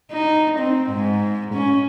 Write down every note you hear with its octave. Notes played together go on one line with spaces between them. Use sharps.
D#4
C4
G#2
C#4